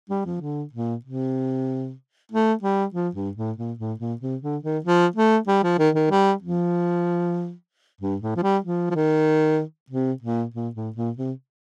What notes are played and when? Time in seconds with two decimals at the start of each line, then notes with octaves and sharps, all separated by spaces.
0.10 G3
0.25 F3
0.41 D3
0.73 A#2
1.05 C3
2.31 A3
2.63 G3
2.94 F3
3.15 G2
3.37 A2
3.58 A#2
3.79 A2
3.99 A#2
4.21 C3
4.42 D3
4.63 D#3
4.84 F3
5.16 A3
5.47 G3
5.63 F3
5.79 D#3
5.95 D#3
6.11 G3
6.43 F3
8.01 G2
8.21 A2
8.36 F3
8.43 G3
8.64 F3
8.90 F3
8.95 D#3
9.90 C3
10.22 A#2
10.54 A#2
10.75 A2
10.96 A#2
11.17 C3